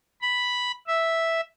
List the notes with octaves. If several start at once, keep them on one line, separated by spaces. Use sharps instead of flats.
B5
E5